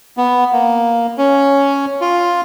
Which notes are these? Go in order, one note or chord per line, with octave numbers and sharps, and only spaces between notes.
B3
A#3
C#4
F4